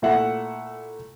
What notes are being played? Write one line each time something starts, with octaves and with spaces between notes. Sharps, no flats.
A#2 A3 E4 E5 F#5